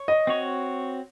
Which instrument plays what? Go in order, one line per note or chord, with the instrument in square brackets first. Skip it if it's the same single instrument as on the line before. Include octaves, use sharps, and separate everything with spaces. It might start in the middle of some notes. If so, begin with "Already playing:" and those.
Already playing: [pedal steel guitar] C#5
[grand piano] D#5
[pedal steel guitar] C4 F#4 C#5